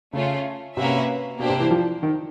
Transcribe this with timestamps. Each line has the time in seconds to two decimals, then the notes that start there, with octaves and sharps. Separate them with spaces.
0.13 C#3 A3 C#4 F4
0.77 C3 A#3 C#4 F#4 B4 E5
1.39 B2 A#3 D4 G4 C5
1.50 C3
1.60 E3
1.71 F3
2.03 D#3